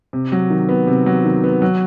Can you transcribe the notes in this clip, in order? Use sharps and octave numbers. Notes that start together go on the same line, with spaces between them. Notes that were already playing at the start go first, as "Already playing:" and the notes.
C3
F#3
D#3
B3
C3
F#3
D#3
B3
F#3